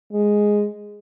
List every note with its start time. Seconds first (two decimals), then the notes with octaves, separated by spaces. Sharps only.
0.13 G#3